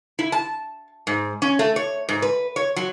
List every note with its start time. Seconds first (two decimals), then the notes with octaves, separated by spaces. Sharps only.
0.19 E4
0.32 A5
1.07 G#2
1.42 C#4
1.59 A3
1.76 C#5
2.09 G#2
2.22 B4
2.56 C#5
2.76 F#3